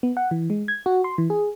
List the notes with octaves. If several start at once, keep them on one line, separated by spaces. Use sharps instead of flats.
B3
F#5
E3
G#3
G#6
F#4
C6
E3
G#4